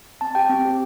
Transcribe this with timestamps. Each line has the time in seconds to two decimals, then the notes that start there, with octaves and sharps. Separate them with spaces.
0.21 C4 A5
0.35 G4 G5
0.49 C4
0.65 G4